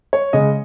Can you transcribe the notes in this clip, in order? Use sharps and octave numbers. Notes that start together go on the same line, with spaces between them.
C#5
C#3 G#3 D#5